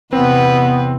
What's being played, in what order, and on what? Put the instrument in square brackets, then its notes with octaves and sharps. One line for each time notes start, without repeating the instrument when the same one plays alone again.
[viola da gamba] E2 C3 [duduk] B3 [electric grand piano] C4 [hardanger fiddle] B4